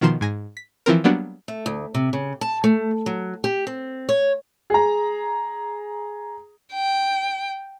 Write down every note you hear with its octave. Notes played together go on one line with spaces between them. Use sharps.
B2 D#3 F3 A#5 C6 E7
G#2 G#5 A#6
B6
E3 F3 C4 A#4
F#3 G3 A#3 B3 D4 F#4
A3
D2
C3
C#3
A5
A3
F#3
G4
C4
C#5
G#4 A#5
G5